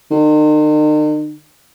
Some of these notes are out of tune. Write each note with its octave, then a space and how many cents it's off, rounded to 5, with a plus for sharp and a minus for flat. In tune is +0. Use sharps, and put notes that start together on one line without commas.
D#3 -40